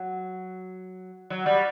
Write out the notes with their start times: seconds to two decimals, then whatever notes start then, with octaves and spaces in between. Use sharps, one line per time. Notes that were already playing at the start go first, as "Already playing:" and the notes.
Already playing: F#3
1.30 F#3
1.46 G3